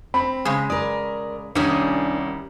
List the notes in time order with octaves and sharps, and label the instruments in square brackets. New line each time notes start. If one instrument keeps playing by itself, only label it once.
[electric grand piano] C4 [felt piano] B5
[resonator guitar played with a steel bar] C#3 G#3
[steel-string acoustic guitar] A#4 D5 [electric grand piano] D#6
[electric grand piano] C2 C#4 [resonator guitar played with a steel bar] D#3 G3 [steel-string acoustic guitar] D4 G#5